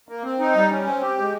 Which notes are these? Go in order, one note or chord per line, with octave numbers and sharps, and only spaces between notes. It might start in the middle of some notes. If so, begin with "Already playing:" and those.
A#3
C4
D#4
G3
C#4
C4
G4
G#3